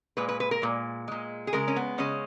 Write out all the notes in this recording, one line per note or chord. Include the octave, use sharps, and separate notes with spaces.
A#2 G#3 B4
B4
B4
A#4
A#2 G#3
A#2 G#3
G#4
C#3 G#3 A#4
C#4
B3
C#3 G#3 C#4